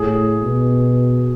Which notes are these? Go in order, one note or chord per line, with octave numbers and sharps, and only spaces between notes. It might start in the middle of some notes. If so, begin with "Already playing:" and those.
Already playing: A2 G#4
B2